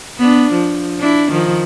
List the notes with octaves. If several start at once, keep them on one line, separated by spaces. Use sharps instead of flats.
B3 D4
F3
D4 E4
D#3 F3